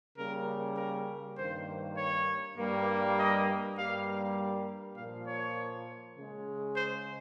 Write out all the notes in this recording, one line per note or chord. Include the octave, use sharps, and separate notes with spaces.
C#3 G3 A#3 A#4
A#4
G2 D#3 A#3 C5
C#5
G2 G3 A#3
D#5
G2 G3 A#3 F5
A#2 F3 A#3 F5
C#5
C#3 G#3
C5